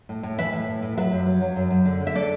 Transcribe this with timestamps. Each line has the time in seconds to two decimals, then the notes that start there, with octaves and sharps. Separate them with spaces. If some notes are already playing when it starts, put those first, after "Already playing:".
0.09 A2
0.23 A2
0.38 E3 B4 E5
0.53 A2
0.68 A2
0.82 A2
0.97 F#3 B4 E5
1.12 F#2
1.26 F#3
1.41 F#3
1.56 F#2
1.71 F#2
1.85 D3
2.01 D3
2.07 E5
2.15 A4 D5